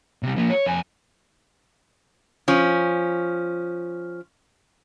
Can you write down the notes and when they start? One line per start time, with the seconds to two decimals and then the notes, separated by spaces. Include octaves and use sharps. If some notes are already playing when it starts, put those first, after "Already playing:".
0.23 C3 G3
0.36 F3 A#3
0.50 C#5
0.66 F2 G#5
2.48 F3 C#4